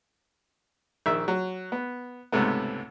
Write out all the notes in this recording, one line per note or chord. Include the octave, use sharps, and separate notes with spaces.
A#1 D#3 E5
F#3
B3
C#2 G#2 C3 A3 B3